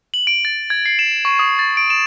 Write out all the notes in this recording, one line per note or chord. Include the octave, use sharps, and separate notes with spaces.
F#7
D7
A6
G#6
C7
E7
C#6
D#6
A6
D7
E7